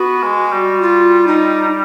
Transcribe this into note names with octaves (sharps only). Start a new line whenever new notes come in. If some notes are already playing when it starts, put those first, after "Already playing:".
Already playing: B3 F#4
G#3
G3
F4
D#4